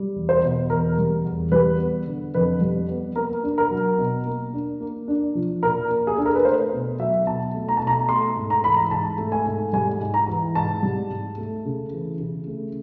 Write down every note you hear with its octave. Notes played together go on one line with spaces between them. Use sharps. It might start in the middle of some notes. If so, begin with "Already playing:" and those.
Already playing: G3
E2
C5
B2
E2 A#4
G3
E2
G3 B4
B3
D3
F2 B4
G3
B3
A#3 A#4
D4
A#4
F#3
B2
A#3
D4
A#3
D4
F3
A#2 A#4
A#3
G#4
D4 A4
A#4
B4
A3 C5
B2
F#3 E5
B2 A5
A3
A#5
A5
B2
A#5
A3 C6
G#2
A#5
E3 B5
A#5
G#2 A5
A3
G#5
G#2
G3 G#5
G#2
A#5
E3
G#2 A5
G3
G#2
A3
C#3
E3
C#3
A3